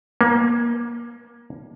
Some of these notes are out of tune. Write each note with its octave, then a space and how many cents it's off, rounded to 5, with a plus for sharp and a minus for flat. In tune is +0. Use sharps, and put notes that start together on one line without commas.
A#3 +25